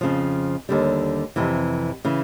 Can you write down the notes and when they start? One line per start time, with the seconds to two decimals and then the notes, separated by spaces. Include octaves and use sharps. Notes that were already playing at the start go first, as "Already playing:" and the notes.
0.01 F2 C#3 F3
0.69 D#2 D3 G3
1.36 F2 C3 E3
2.05 C#3 E3